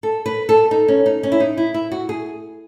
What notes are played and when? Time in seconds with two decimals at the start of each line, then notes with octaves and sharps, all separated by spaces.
0.03 A4
0.26 B4
0.49 A4
0.71 D#4
0.88 C#4
1.06 D#4
1.23 C#4
1.32 E4
1.40 D#4
1.57 E4
1.74 E4
1.92 F#4
2.09 G#4